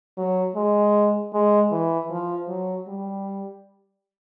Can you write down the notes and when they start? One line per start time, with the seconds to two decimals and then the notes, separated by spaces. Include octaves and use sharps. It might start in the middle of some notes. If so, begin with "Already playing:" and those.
0.17 F#3
0.56 G#3
1.33 G#3
1.71 E3
2.10 F3
2.49 F#3
2.87 G3